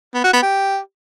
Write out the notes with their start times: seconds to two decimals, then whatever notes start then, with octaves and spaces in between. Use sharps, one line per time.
0.15 B3
0.24 F#4
0.33 B3
0.43 G4